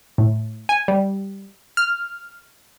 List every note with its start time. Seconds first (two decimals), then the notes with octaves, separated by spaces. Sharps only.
0.18 A2
0.69 G#5
0.88 G3
1.77 F6